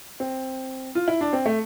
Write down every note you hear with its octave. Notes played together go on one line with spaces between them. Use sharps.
C4
F4
E4
D4
C4
A3